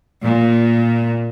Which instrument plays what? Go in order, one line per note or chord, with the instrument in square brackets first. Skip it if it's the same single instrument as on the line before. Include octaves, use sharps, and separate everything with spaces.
[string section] A#2